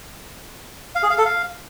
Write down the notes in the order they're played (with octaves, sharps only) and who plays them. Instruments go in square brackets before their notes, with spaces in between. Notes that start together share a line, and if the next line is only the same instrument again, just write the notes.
[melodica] F5
G#4
F5
A4
F5